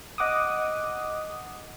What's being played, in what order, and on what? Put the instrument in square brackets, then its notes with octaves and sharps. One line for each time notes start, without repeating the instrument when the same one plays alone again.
[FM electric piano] D#5 F#5 D6 D#6